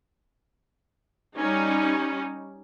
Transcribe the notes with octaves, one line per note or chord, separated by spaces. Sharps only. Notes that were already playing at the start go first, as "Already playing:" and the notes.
G3 C#4 D#4